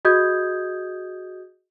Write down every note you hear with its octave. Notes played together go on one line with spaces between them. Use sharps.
F#4 G#4 D#5 D#6 G6 G#6